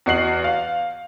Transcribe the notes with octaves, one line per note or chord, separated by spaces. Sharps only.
E2 F#4 D#5 C7 F#7
F5